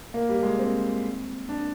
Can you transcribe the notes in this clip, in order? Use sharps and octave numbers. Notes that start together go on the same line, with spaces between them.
A#3
G3
G#3
C4
D4